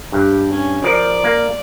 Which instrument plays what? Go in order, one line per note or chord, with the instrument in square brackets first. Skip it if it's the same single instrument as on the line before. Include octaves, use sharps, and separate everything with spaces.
[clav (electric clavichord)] G2 [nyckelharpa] G4
[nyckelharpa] C#4
[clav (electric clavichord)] F3 A#4 [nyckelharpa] D5
[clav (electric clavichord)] A#3